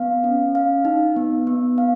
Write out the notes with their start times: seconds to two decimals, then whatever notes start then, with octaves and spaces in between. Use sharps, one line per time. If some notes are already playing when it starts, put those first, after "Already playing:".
Already playing: B3 F5
0.24 C#4
0.55 F5
0.85 D#4
1.16 B3
1.47 B3
1.78 F5